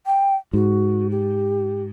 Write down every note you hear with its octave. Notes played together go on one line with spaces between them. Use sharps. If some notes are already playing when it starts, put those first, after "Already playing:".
G5
G#2 F#4
G4